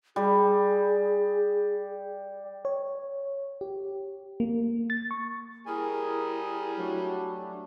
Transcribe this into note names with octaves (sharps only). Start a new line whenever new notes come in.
G3 G#4
C#5
G4
A#3
A6
C#6
G3 E4 G#4 A#4 G#5
F#3 A3 D4